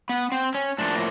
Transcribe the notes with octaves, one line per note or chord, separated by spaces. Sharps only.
B3
C4
C#4
A2 F3 A#3 D4